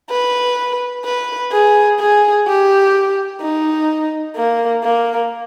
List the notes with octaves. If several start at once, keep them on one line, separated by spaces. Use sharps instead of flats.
B4
B4
G#4
G#4
G4
D#4
A#3
A#3